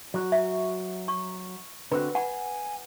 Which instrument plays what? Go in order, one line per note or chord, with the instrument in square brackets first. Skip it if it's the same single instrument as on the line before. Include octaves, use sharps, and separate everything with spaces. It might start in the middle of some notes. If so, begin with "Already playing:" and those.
[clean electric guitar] F#3 F#4
[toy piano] E5
C#6
[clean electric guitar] D3 C4 F#4 [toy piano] B4 B5
[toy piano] F#5 B5 [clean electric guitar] G#5